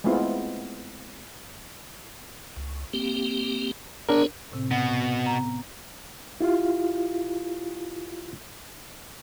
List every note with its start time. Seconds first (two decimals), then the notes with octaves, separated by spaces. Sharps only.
0.04 G#3 A3 B3 C4 E4 F4
2.56 C#2
2.94 A#3 C4 G4
4.09 B3 D4 G#4 A#4 C#5
4.52 A2 C3 C4
4.71 B2 F#5
5.25 B3 A#5
6.41 E4 F4 G4 F5